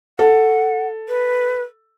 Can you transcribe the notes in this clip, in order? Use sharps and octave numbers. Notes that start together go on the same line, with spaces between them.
A4 F#5
B4